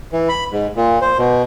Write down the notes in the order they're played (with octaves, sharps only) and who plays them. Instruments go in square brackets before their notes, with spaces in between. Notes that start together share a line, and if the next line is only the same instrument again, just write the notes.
[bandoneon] E3
B5
G#2
A#2
C5
B2